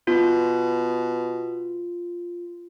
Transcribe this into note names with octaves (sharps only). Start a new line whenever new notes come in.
B2 F4